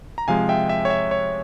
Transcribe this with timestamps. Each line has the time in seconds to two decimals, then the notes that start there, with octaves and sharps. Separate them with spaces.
0.18 A#5
0.28 C3 F3 G#3 F5 G#5
0.49 E5 G5
0.69 E5
0.85 C#5
0.90 E5
1.11 C#5